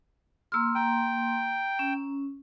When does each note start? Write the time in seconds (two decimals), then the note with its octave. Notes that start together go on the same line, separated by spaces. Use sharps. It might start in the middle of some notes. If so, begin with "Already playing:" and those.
0.52 A#3 C6 E6 F6
0.75 G5 A#5
1.79 C#4